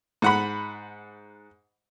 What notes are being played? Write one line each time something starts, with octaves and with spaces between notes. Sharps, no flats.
G#2 F#5 B5